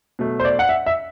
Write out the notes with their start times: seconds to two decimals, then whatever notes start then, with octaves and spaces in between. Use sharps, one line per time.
0.19 B2 F#3 A3
0.40 C5
0.45 D5
0.59 F#5
0.69 E5
0.86 E5